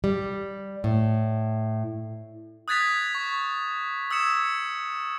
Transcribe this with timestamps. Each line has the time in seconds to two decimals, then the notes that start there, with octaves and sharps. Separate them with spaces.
0.04 G3
0.84 A2
2.68 D#6 F#6 G#6 A6 B6 F7
3.15 C#6
4.10 D#6 E6 G#6 C#7 E7